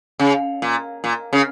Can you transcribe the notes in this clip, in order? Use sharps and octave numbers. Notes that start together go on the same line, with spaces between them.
C#3
A#2
A#2
C#3